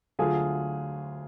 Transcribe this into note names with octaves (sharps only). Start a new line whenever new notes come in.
D2 D3 F#3 F4 G#4